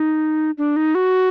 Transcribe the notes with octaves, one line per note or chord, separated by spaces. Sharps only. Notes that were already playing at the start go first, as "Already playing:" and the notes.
Already playing: D#4
D4
D#4
F#4